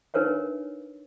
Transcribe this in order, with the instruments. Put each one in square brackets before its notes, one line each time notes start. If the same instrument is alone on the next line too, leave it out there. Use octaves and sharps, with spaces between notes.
[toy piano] D4 D#4 A#4 B4 C#5 E5